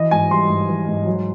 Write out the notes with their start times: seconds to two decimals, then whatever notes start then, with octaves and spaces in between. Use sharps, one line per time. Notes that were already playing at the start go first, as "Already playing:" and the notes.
Already playing: E3 D#5
0.11 G#2 G#5
0.30 G3 C6
0.49 G#2
0.69 E3
0.88 G#2
1.06 F#3